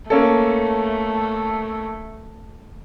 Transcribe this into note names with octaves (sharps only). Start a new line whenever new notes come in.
A3 A#3 C#4 A4